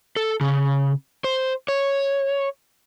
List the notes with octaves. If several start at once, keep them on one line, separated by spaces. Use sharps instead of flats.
A4
C#3
C5
C#5